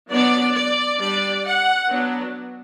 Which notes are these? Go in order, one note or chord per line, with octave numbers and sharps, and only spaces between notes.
F#3 B3 D4 D5
D5
G3 D4 D5
F#5
F#3 B3 D4